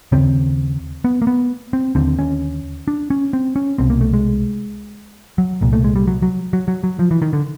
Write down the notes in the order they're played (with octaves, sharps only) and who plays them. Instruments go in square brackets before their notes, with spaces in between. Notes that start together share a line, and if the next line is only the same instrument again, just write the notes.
[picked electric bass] D#2 C#3 C4
B3
A#3
B3
C4
D#2 D3 C4
C#4
D4
C#4
C4
C#4
C2 B2 C4
A#3
A3
G#3
F#3
C2 A#2
A3
G#3
G3
F#3
F#3
F#3
F#3
F#3
F3
E3
D#3
D3